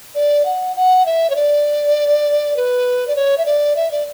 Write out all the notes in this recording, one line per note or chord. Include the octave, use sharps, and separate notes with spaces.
D5
F#5
F#5
E5
C#5
D5
B4
D5
C#5
E5
D5
E5
D5